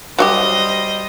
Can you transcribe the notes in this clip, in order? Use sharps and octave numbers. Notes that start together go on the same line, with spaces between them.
F#3 G3 F#4 G4 C5 D#5